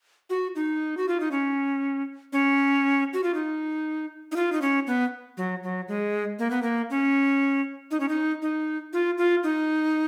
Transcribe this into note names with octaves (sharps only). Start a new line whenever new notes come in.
F#4
D#4
F#4
F4
D#4
C#4
C#4
F#4
F4
D#4
D#4
F4
D#4
C#4
B3
F#3
F#3
G#3
A#3
B3
A#3
C#4
D#4
C#4
D#4
D#4
F4
F4
D#4